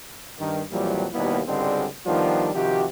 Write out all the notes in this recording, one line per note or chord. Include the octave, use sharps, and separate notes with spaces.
G2 D#3
F2 A#2 E3 F#3 G3
D#2 B2 G3 A#3 B3 E4
C#2 G#2 D3 G3 G#3 C4
D#3 F3 G3 B3 D4 F4
C3 D#3 F3 F#4 G4